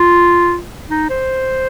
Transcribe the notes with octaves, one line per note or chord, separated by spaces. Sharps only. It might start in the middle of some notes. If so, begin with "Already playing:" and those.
Already playing: F4
D#4
C5